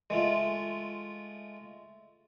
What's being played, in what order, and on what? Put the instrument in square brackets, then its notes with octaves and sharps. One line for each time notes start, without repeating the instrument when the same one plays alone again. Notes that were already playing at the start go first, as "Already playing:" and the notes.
[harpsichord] G#3 A3 F4